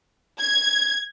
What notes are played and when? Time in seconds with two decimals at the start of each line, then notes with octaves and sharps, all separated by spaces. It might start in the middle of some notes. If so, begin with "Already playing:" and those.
0.40 G#6